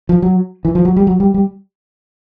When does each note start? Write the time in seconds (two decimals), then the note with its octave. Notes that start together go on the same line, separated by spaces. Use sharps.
0.09 F3
0.22 F#3
0.65 E3
0.75 F3
0.85 F#3
0.96 G3
1.07 F#3
1.20 G3
1.34 G3